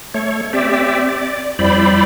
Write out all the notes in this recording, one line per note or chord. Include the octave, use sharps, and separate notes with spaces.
A3 C#5
C4 G4 D5 E5
D5
F2 G3 E4 C5 D5 B5